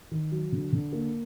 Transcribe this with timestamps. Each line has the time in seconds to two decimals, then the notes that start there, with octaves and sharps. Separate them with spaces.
0.11 D#3
0.32 F#3
0.52 D3
0.73 D3
0.93 A#3